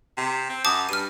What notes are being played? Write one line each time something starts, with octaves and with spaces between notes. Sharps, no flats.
C3
C4
F#2 A5 D6 D#6
G2 F6 D#7